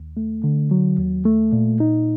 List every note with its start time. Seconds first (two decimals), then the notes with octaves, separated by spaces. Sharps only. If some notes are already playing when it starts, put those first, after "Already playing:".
Already playing: D#2
0.17 A3
0.44 D3
0.71 F#3
0.99 D#2
1.25 A3
1.53 A#2
1.80 D#4